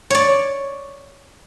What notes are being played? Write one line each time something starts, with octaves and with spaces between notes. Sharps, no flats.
C#5 D5